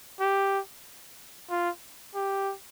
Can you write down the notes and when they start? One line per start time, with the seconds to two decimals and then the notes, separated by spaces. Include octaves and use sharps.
0.20 G4
1.50 F4
2.15 G4